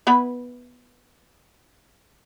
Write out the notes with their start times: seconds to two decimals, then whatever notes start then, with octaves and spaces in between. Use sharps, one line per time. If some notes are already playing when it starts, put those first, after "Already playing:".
0.07 B3 E4 B4